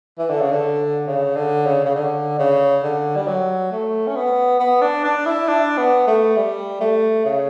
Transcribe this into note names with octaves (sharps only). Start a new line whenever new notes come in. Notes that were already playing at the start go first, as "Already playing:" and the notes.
E3
D3
C#3
D3
C#3
D3
C#3
C#3
D3
C#3
D3
G3
F#3
A3
C#4
B3
B3
D4
D4
E4
D4
B3
A3
G3
A3
C#3